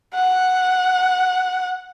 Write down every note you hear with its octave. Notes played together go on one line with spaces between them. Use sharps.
F#5